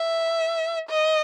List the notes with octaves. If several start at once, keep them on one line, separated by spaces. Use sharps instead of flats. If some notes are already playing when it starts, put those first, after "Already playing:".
Already playing: E5
D#5